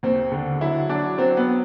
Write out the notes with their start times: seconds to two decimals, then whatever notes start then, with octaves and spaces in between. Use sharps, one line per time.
0.03 D#2 C4
0.32 D3
0.61 F#3 E4
0.89 F#3 D4
1.18 F#3 C4
1.37 B3